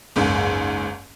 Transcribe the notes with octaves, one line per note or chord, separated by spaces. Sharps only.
F#1 C#2 G#2